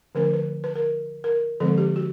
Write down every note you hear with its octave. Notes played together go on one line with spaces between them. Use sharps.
D3 F3 A3 C#4 A#4
B4
B4
A#4
A#4
D3 F3 G#3 C4 A4
G4
F#4